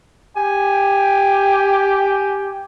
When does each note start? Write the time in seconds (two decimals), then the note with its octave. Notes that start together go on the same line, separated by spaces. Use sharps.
0.37 G4 G#5